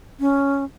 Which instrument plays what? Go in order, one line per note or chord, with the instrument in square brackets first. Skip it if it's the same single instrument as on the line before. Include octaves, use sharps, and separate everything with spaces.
[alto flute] C#4